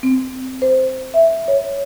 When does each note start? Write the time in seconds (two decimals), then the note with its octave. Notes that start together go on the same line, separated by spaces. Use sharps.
0.03 C4
0.62 C5
1.14 E5
1.48 C#5